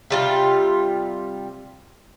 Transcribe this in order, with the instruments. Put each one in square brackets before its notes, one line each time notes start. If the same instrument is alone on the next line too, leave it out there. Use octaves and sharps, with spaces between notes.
[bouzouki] C3 G3 F4